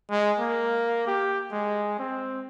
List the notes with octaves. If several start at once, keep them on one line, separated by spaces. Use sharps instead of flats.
G#3
A#3
G4
G#3
C4